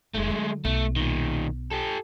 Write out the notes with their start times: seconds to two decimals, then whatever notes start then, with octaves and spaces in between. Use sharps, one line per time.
0.14 F1 D#3 G#3 A3
0.29 D3 F#3
0.65 B1 A3
0.96 A#2 D#3
1.71 G4 A4